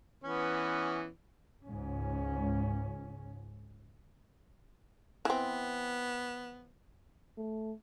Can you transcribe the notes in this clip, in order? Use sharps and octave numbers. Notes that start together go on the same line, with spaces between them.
E3 B3 C#4
C#2 G#2 C#4
E3 B3 C4
A3